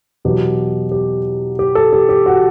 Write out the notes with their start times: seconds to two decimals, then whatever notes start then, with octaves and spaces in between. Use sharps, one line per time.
0.25 E2 B2 F#3 G4
0.92 G4
1.59 G4
1.75 A4
1.93 G4
2.09 G4
2.26 F#4